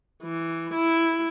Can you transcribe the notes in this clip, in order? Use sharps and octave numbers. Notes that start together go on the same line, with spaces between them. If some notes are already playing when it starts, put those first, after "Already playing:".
E3
E4